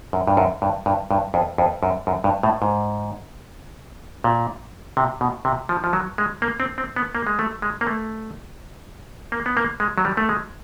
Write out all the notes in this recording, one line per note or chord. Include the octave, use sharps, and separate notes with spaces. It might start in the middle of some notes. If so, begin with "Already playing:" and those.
F#2
G2
F#2
G2
G2
G2
F2
F2
F#2
F#2
G2
A2
G#2
A#2
C3
B2
C3
F3
F3
F#3
G#3
A#3
C4
C4
B3
A#3
G#3
A3
G#3
A#3
A3
A#3
B3
A#3
G#3
F#3
G3
A3
G#3